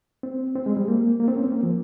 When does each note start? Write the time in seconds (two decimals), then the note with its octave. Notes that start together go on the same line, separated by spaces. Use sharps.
0.23 C4
0.55 C4
0.66 G#3
0.77 G3
0.88 A#3
1.20 A#3
1.28 C4
1.36 C#4
1.44 C4
1.52 A#3
1.63 F3